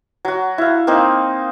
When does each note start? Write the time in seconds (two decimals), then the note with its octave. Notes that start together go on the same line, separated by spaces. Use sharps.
0.25 F#3 F#4
0.58 E4 F5
0.87 A#3 C4 D#4